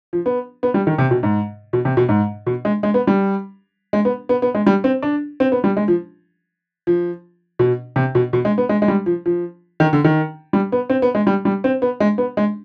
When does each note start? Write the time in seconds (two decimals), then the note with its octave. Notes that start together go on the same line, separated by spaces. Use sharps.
0.13 F3
0.26 B3
0.63 B3
0.74 G3
0.87 D#3
0.98 C3
1.11 B2
1.23 G#2
1.73 B2
1.85 C3
1.97 B2
2.09 G#2
2.46 B2
2.65 G#3
2.83 G#3
2.94 B3
3.07 G3
3.93 G#3
4.05 B3
4.29 B3
4.42 B3
4.55 G#3
4.67 G3
4.84 C4
5.03 D4
5.40 C4
5.52 B3
5.64 G3
5.77 G#3
5.88 F3
6.87 F3
7.59 B2
7.96 C3
8.15 B2
8.33 B2
8.45 G#3
8.58 B3
8.69 G#3
8.82 G#3
8.88 G3
9.06 F3
9.26 F3
9.80 D#3
9.93 D3
10.04 D#3
10.53 G3
10.72 B3
10.90 C4
11.02 B3
11.15 G#3
11.27 G3
11.45 G3
11.64 C4
11.82 B3
12.00 G#3
12.18 B3
12.37 G#3